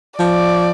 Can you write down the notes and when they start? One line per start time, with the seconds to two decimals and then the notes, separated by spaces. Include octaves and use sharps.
0.19 F3 D5